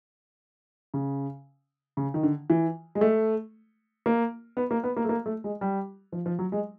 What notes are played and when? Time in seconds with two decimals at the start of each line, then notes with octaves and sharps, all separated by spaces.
0.94 C#3
1.97 C#3
2.14 D#3
2.23 D3
2.50 E3
2.95 G#3
3.01 A3
4.06 A#3
4.57 B3
4.71 A#3
4.84 B3
4.97 A#3
5.05 A3
5.09 A#3
5.26 A3
5.44 G#3
5.61 G3
6.12 F3
6.26 F3
6.39 F#3
6.52 G#3